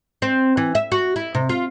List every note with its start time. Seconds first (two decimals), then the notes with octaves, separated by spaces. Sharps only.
0.22 C4
0.57 E3
0.75 E5
0.92 F#4
1.16 E4
1.35 C3
1.49 F4